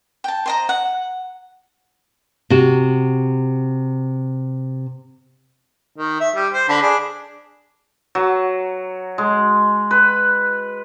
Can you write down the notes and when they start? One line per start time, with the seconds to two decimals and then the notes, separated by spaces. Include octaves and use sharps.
0.24 G5 A5
0.46 C5 D#5 A#5
0.69 F#5
2.50 C3 F#4
5.97 D#3
6.20 E5
6.36 G3
6.53 C5
6.69 D3 A4 B5
6.82 D4 G#4
8.15 F#3
9.18 G#3
9.91 B4